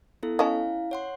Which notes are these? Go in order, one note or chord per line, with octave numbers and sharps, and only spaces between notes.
B3 E4 A4
C#4 E4 D#5 F5 A5
C#5 F#5 C6